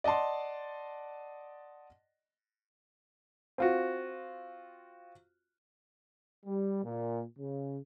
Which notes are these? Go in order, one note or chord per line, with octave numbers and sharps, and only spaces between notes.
D5 D#5 F#5 A5 C6
C4 F4 F#4
G3
A#2
C#3